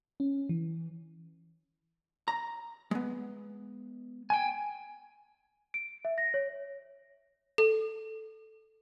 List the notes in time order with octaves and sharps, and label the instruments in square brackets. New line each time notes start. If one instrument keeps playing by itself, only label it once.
[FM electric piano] C#4
E3
[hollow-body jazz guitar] A#5
G#3 B3
[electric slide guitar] G5 G#5
[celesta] D7
E5
A#6
C#5
[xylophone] A4